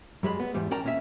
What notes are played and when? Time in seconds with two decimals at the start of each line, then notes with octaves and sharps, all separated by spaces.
0.23 F#2 G3 G#3 B5
0.40 B3
0.54 E2 G#2 G3
0.71 C#4 A#4 D5 G5 A5 A#5
0.84 A#2 C#4 E5